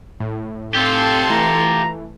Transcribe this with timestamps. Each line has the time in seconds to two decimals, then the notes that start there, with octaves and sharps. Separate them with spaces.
0.20 A2
0.74 C4 F4 G4 A4 C6
1.30 E3 A3 A#5